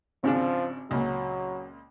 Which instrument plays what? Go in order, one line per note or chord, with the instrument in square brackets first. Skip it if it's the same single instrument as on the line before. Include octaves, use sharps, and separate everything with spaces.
[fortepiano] G#1 C#3 D4 [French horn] F3 [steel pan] C4
[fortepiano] C#2 A#2 [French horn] F#3